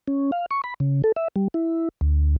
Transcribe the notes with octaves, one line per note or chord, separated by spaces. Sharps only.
C#4
F5
C#6
B5
C#3
A4
E5
G3
E4
D2